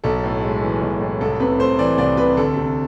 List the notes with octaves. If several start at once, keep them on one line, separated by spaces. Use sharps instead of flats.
B1 A4
A2
G#3
E3
B1
A2
C2 A4
C3 B4
A3 C5
E3 D5
C2 D5
C3 B4
D2 A4
C3